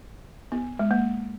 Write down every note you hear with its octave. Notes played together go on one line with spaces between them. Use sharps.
B3
G#3
A#3